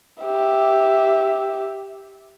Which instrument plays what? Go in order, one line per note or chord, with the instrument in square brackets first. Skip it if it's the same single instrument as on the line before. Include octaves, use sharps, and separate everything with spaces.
[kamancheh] G4 E5